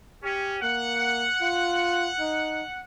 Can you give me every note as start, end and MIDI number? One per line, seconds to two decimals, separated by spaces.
0.24 0.57 61
0.24 0.59 67
0.62 1.28 58
0.62 2.81 78
1.41 2.10 65
2.20 2.63 63